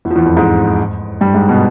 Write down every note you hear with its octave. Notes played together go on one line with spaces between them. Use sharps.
E2 E3
F3
E2 E3
F2 F3
G#2 G#3
G2 G3
G#2 G#3
B2 B3